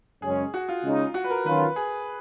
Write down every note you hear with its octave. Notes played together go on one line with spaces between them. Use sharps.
F#2 C#3 G#3 C#4 G#4
F#4
F4
C#3 G#3 D#4
F#4
B4
A#4
D#3 F#3 C#4 F4 A#4 B4
G#4